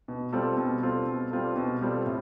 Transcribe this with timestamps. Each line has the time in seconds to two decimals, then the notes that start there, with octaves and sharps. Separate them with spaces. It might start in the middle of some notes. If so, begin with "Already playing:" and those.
0.08 B2
0.33 G3 C4 F4 A4
0.57 B2
0.83 G3 C4 F4 A4
1.06 B2
1.31 G3 C4 F4 A4
1.56 B2
1.81 G3 C4 F4 A4
2.06 A2